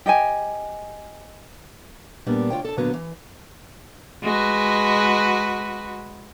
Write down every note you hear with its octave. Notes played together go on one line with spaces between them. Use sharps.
G4 D#5 G5 G#5
A#2 G3 B3 D4
D2 F4 C#5 G5
A4 A5
A#2 D3 F#3 A#3 B3
E3
G#3 F#4 B4